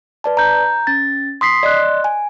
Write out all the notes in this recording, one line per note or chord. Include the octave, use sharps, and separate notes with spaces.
B4 D5 A5
A#5 G6
C#4 A6
C6 D#6 B6 C7
D5 D#5 C6 F#6
G#5